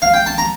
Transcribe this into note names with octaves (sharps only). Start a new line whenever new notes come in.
F5
G5
A5
A#5